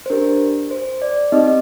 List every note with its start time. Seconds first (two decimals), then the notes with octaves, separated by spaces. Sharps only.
0.06 C5
0.10 D4 G4 A#4
0.71 C5
1.02 D5
1.32 C4 D#4 G4 D#5